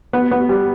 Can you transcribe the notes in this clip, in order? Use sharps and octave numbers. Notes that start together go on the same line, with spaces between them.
B3
B3
G3